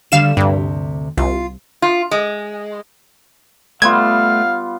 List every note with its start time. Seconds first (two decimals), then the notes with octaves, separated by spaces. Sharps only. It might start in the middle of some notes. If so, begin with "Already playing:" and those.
0.12 D3 G3 A3 F5 E7
0.37 D2 G2 C3
1.17 C2 F4
1.82 F4
2.11 G#3
3.82 G3 A3 B3 F4 F5 G#6